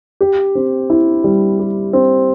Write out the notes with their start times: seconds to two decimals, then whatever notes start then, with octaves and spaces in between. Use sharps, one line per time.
0.21 G4
0.55 C4
0.90 E4
1.24 G3
1.59 G4
1.93 C4